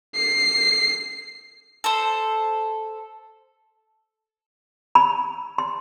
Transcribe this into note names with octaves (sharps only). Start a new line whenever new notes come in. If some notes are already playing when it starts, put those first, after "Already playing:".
C7
A4 C5
B5
C6